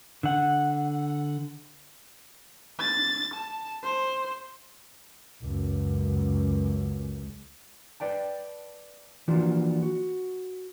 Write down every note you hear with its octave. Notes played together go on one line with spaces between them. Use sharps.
D3 F#5
A6
A5
C5
C#2 F#2
B4 D5 G5 A5
E3 F3 A#3 D4 F4 F#4
F#4